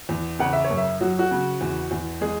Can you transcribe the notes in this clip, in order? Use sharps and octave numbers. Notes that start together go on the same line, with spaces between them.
E2
C#3 F#5
E5
C#5
F#2
E5
F#3 F#4
F#4
C#3
E2
E2
G#3 G#4